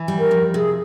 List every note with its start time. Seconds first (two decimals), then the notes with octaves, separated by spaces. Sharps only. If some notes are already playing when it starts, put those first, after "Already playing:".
Already playing: E3
0.08 G3
0.19 A#4
0.31 F2
0.54 C3 G#4